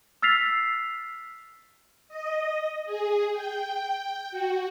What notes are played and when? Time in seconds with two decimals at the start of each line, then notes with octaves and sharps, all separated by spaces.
0.22 E6 F6 A6 B6 C7 F7
2.09 D#5
2.85 G#4
3.32 G5
4.31 F#4